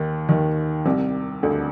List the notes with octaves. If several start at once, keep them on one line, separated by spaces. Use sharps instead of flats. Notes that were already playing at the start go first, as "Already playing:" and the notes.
Already playing: D#2 D#3
D#2 D#3
C2 C3
D2 D3